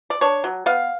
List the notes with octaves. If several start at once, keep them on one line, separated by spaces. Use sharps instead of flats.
D5
D4 C#5
F#3
B3 F5